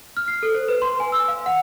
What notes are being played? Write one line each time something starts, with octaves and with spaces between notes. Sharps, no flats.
F6
C7
A4
C5
B4
C6
G#5
E6
F5
F#5